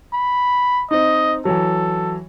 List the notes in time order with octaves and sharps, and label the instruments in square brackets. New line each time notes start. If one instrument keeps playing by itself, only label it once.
[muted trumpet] B5
[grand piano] C4 D#4 [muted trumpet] D#5
[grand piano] E3 F#3 [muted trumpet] A4